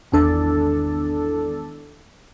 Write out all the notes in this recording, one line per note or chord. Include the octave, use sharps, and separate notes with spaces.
G#1 E2 D4 A4